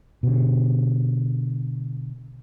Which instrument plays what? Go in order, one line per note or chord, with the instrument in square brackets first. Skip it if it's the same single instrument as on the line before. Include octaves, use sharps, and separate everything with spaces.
[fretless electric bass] B2 D3